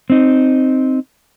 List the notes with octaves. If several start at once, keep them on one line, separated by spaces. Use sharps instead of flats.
C4 D#4